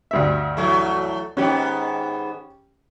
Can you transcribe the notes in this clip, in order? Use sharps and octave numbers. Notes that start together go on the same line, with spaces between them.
D2 G2 E5
E3 F#3 A3
G#2 D#3 B3 C#4 G4